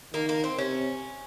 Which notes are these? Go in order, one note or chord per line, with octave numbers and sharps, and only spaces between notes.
D#3 A#3
A#3
C4
C3 C#4